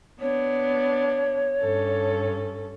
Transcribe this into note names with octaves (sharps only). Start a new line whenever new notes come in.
B3 D4 C#5
G2 C#4 A4